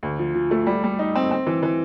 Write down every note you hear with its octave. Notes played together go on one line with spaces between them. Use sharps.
D2
F3
F3
A3
G3
G3
D#4
C4
C4
E3
E3